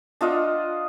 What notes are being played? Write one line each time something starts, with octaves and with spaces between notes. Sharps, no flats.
D4 F4 D#5 F#5